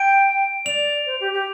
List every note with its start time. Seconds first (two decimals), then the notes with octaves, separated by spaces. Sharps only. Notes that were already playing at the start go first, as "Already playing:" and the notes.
Already playing: G5 D7
0.66 D5 F7
1.06 C5
1.20 G4
1.33 G4